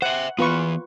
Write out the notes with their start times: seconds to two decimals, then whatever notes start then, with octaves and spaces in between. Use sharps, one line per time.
0.02 C5 E5 F#5
0.39 E3 B3 F4 B4 C#6